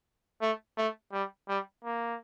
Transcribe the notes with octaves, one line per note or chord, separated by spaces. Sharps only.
A3
A3
G3
G3
A#3